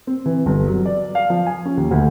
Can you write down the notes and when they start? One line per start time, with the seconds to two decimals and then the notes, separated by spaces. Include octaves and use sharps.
0.07 C4
0.26 E3
0.46 G1
0.68 F#3
0.85 D5
1.15 F5
1.30 F3
1.46 G#5
1.66 C#4
1.77 D#2
1.91 D2